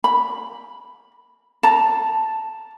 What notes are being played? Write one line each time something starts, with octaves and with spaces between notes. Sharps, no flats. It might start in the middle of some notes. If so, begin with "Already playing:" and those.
B5
A5 A#5